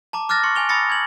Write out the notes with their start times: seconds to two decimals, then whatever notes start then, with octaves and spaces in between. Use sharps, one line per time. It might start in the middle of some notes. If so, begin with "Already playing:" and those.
0.13 A5 A#5 D6
0.29 D6 F6 F#6 A6 A#6
0.43 C6 C#6 C#7
0.55 G#5 F7 G7
0.69 B5 D#6 E6 A6 A#6 C#7
0.90 G#6 F#7